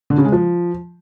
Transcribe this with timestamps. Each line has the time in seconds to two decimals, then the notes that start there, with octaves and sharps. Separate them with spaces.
0.10 D3
0.18 C#3
0.25 G#3
0.32 F3